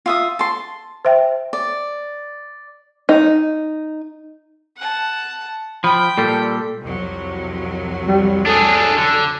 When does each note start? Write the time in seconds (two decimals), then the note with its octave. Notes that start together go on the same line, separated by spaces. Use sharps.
0.06 F4 E5 D#6
0.39 A5 C6
1.05 C5 E5 G5
1.53 D5
3.09 D#4
4.77 F#5 A5
5.84 F3 G5 B5
6.17 A#2 G3 A4
6.81 C2 F2 F#3
8.08 G3
8.46 D4 G#4 A4
8.98 D3